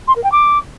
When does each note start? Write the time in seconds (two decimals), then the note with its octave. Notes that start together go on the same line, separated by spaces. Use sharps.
0.08 C6
0.16 A#4
0.24 G5
0.32 D6